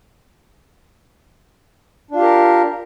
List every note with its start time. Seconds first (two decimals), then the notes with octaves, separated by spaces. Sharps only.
2.11 D4
2.15 F4
2.19 G4
2.23 A#4